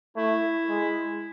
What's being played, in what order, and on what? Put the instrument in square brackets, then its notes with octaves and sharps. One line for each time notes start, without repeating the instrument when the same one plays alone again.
[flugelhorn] A3 [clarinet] E4
[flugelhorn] G#3